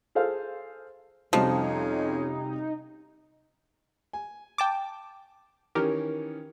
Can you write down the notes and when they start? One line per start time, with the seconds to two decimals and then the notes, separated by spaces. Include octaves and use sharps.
0.15 G#4 A4 C5 F5
1.33 F2 C3 F3 G3 C#4 D#4 F#4
4.13 G#5
4.58 G5 A5 D6
5.75 D#3 E3 C#4 G4 A#4